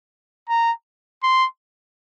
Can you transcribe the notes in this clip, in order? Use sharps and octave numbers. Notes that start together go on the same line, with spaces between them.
A#5
C6